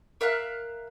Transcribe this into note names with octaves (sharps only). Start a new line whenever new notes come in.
A#4 E5 F5 F#6